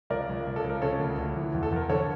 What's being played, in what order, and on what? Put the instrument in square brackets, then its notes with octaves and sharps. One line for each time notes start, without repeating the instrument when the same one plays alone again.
[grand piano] C#2 A#4 D5
C#2
C#2
A4
C#2
A#4
C#3 A4 C#5
D2
D2
E3
E2
A4
E2 A#4
D3 A4 C#5